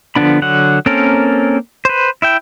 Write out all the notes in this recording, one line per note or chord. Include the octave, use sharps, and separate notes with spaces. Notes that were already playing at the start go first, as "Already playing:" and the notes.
D3 F3 B3 D4 B5
D3 F#3 F#5
A#3 C4 C#4 A4 A#4
B4 C5
E4 E5 G5